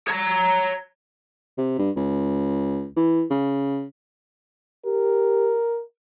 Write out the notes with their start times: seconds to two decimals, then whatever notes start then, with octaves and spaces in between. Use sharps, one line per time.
0.08 C#5 A#5
1.58 C3
1.78 G2
1.96 C#2
2.96 E3
3.30 C#3
4.86 G4 A#4